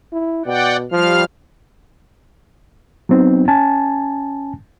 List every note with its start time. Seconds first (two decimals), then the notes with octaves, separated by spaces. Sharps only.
0.12 E4
0.46 B2 D5 F#5 G5
0.92 F3 G3 F5 F6
3.09 F#3 B3 C4 D#4
3.48 C#4 G#5 A5